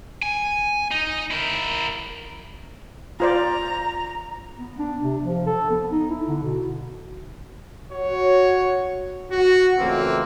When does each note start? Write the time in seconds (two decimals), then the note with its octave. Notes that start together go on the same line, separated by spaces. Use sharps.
0.22 G#5
0.91 D#4
1.31 E4 A#4
3.20 F4 C5 D5 A#5
4.58 B3
4.79 D4
5.03 C3
5.23 F3
5.46 A4
5.70 B3
5.91 D#4
6.10 E4
6.28 D3
6.43 B2
7.93 F#4 C#5
9.31 F#4
9.79 F2 C#3 E3 A3 A#3 C4